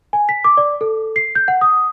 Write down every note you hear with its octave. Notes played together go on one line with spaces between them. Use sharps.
G#5
B6
D6
D5
A4
C7
G6
F#5
D#6